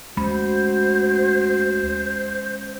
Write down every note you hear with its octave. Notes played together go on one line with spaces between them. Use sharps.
D2 G#3 C#4 F#4 C5 B5